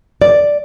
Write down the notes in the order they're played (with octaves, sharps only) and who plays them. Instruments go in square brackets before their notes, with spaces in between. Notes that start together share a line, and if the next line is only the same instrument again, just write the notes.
[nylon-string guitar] D5